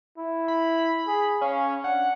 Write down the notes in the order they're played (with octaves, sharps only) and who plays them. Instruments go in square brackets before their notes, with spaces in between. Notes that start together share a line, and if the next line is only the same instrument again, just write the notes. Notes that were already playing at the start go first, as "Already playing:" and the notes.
[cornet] E4
[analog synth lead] B5
[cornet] G#4
[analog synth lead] C#4 [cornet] F5
[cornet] D4 [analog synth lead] F#5